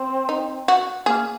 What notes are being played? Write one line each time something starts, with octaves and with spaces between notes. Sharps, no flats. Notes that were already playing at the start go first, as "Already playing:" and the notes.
Already playing: C4
D#4
F#4
A#3 G#4